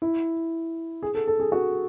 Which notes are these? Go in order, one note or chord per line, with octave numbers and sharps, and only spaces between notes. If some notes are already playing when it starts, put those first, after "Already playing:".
E4
G#4
A4
A4
G#4
F#4